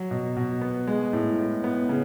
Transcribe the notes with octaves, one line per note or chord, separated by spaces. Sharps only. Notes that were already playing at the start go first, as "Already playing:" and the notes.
Already playing: F#3
B2
B2
B3
G#3
A2
A2
B3
C#3